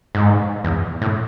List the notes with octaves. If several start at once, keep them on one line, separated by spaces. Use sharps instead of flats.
G#2
E2
A2